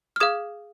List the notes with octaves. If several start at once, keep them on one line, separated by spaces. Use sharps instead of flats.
F6
G#4 F5 D#6 G#6